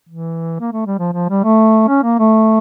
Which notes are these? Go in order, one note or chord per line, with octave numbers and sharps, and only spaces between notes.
E3
A#3
A3
G3
F3
F3
G3
A3
C#4
A#3
A3